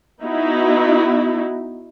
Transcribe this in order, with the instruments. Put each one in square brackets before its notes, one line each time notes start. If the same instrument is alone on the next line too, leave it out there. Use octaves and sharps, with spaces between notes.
[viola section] B3 D#4 E4 F#4